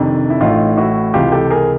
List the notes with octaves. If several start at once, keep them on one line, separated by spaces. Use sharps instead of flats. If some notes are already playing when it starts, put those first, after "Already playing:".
Already playing: F2 C3 D#3 D4
E4
A1 A2 E3 D#4 F4
E4 F#4
C#2 C3 E3 F4 G4
G4 A4
G#4 A#4